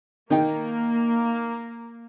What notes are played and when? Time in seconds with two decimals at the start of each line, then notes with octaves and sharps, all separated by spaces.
0.30 D#3 A#3 D#4 G5